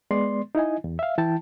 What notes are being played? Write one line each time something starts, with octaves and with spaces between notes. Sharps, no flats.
G#3 B3 D5 C6
D#4 E4 D#5 G#5
E2
E5 F5
E3 E4 G5 A5